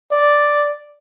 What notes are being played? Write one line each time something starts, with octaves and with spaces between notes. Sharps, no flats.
D5